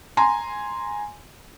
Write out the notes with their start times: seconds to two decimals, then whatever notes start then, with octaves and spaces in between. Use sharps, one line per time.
0.17 G#5 A#5 C6